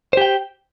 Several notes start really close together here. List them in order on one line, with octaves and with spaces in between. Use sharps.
C5 G4 G5